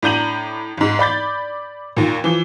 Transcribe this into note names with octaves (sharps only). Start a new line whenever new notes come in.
A2 D4 A#5 G6 D#7 F#7
G#1 G#2
D5 B5 G6 A6
D#2 A#2
E3 F3